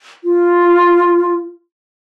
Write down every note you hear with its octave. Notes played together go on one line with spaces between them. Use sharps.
F4